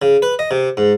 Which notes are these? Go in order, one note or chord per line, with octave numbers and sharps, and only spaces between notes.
C#3
B4
D#5
C3
G#2